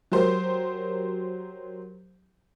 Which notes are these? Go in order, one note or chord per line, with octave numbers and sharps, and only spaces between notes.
F#3 G4 A#4 C5